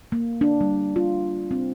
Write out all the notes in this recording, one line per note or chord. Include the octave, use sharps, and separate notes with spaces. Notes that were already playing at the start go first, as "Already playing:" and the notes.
A#3
D4
G3
F4
C4